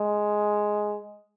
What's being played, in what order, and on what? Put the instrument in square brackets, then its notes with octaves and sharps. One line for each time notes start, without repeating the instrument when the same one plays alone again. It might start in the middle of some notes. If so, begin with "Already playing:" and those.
Already playing: [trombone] G#3